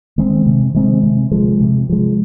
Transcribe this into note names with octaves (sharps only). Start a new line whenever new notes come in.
D#3 G#3 C4
C3
D#3 G#3 C4
C3
F3 G#3
C3
F3 G#3